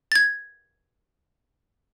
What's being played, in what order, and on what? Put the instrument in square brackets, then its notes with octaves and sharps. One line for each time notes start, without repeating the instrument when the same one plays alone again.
[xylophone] G#6 A6